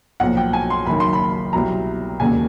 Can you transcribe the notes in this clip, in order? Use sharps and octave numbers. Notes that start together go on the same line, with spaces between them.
B1 A#2 F3 F#5
G5
G#5
C6
F#1 F#2 D#3 B5
C6
B5
C2 B2 F#3 A#5
E1 D#2 C#3 G#5